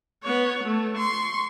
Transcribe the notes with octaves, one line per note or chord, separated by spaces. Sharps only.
B3 C#5
A3
C6 C#6